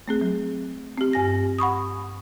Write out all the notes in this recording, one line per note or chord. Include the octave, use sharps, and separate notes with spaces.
A3 C4 G#4
F#3
C4 G4
G2 G#5 A#6
F#5 B5 C#6 D#6